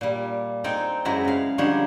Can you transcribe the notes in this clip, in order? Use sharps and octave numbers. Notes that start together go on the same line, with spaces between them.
A#2 G3
C4 D#4 A4 G5 G#5
F#2 G#3 E4 F#4 E5 A#5
C#3 F5
D3 F3 G3 D4 D#4 C#5